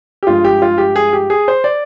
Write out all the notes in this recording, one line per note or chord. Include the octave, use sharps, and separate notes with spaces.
G4
G2 F3 G#3 F4
G4
F4
G4
G#4
G4
G#4
C5
D5